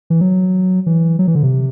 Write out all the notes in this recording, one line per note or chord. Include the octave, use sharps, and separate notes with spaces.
E3
F#3
E3
F#3
E3
D3
C3